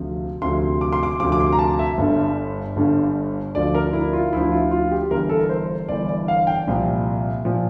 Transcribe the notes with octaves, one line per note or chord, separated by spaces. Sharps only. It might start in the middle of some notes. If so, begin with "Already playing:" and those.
Already playing: D2 C3 F3
D2 C3 F3 C6
D6
C6
D6
D2 C3 F3 D6
D6
C6
A#5
A5
E5
G1 G2 D3
G1 G2 D3
D2 D3 F3 D5
A#4
E4
F4
D2 D3 F3 E4
F4
F4
G4
G1 G2 E3 A#4
A4
A#4
C5
G1 G2 E3 D5
D5
F5
G5
C2 A#2 F3
A#2 F3